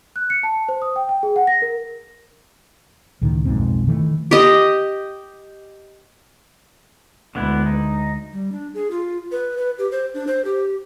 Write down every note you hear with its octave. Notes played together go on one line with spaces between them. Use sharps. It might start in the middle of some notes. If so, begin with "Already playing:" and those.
F#6
C#7
A5
C5
D#6
G5
G5
G#4
F#5
A#6
A#4
C#2 A2 D#3
B1 F2 G#2 C4
D#3 E3 A3
G4 D#5
D2 D3 G#3 B3 E4
D#4
G3
D4
G#4
F4
B4
B4
G4
C5
D4
C5
G4